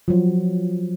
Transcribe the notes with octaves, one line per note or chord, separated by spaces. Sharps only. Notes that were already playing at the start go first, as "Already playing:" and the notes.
F3 F#3